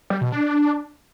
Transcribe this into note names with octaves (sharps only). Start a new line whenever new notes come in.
G3
B2
D4